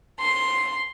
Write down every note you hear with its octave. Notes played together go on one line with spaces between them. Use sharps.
C6